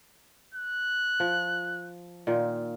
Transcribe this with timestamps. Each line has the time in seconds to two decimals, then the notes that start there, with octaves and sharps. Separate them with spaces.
0.54 F#6
1.20 F3
2.27 A#2 D#3 F4